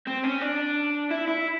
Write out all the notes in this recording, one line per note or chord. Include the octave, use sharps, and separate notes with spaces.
C4
C#4
D4
E4
E4